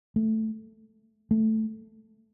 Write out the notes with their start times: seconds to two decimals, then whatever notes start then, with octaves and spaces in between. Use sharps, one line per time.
0.16 A3
1.31 A3